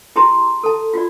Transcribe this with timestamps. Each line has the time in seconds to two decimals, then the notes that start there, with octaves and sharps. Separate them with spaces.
0.16 E4 G4 G#4 A5 A#5 C6
0.63 A4 A5
0.93 F4 F#4 D5